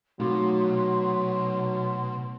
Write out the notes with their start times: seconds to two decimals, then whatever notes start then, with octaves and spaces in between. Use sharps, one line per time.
0.20 B2 F#3 A3 D#4 F#4 C6